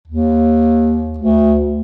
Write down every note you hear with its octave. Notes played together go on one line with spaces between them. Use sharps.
D#2
D2